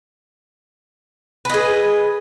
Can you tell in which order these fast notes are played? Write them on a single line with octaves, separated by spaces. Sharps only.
B4 D#5 G#4